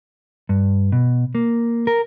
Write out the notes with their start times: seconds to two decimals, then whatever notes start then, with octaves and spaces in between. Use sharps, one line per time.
0.49 G2
0.92 B2
1.35 A#3
1.87 A#4